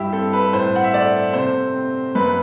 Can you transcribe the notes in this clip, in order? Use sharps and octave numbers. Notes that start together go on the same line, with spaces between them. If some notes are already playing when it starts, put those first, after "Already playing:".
Already playing: G2 E4 G4
C4 A4
B4
A2 C5
F#5
E5
A3 D5
C3 C5
C4
F#2 B4